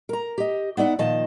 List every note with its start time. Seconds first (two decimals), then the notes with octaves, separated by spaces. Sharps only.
0.09 A#4 A#5
0.38 G4 D#5
0.77 B3 D#4 D5 E5 F#5
0.99 A#2 D#3 F3 D#5 A5